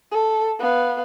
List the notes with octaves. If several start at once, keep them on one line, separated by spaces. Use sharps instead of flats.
A4
B3 F5